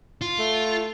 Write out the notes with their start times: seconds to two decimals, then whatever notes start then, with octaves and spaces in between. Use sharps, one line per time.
0.21 F4
0.39 A3